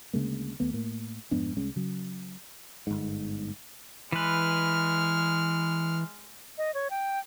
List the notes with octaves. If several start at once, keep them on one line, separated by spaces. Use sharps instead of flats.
D2 C#3 G#3 A#3
D#2 A3 B3
A2 A#3
F2 G#2 B3 D4
C2 G#3 C#4
C#3 F#3
G1 G#2
E3 G#3 B4 F6
D#5
C#5
G5